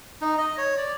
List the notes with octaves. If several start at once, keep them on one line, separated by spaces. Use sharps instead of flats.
D#4
D#5
C#5
D5